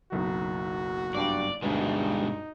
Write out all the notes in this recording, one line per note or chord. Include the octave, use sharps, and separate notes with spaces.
F#1 B1 D#4 F#4
G2 D5
D2 G2 B2 G#3 D#4 B4